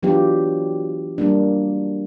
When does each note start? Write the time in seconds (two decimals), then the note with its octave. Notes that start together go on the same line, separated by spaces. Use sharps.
0.03 E3 F#3 B3 D4 F4 G4
1.18 G3 A#3 D4